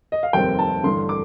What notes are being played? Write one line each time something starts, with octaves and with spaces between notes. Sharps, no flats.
D#5
F5
F1 D#2 D#3 G3 C4 G5
A5
A1 G2 D3 C6
D6